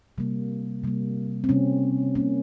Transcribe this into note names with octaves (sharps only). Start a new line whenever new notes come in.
C3 G3 A#3
C3 G3 A#3
C4
C3 G3 A#3 C#4
C3 G3 A#3 C#4